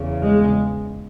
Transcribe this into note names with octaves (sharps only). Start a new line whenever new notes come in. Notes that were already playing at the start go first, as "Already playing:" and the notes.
Already playing: E2 C#3
G#3